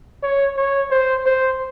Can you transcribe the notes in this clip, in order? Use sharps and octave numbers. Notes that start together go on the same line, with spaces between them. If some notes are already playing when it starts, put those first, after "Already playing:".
C#5
C#5
C5
C5